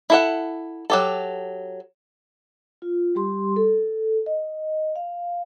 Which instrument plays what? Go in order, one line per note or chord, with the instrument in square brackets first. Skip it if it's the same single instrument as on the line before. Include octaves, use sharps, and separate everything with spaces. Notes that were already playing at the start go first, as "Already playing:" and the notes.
[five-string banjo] E4 A4 F#5
F#3 G4 A4
[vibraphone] F4
G3 G4 C6
A4
D#5
F5